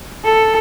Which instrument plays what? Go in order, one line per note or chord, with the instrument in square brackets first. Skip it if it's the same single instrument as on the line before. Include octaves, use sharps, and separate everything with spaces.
[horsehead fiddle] A4